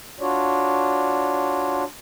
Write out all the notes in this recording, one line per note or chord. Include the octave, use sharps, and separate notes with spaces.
D4 F4 F#4 C#5 D5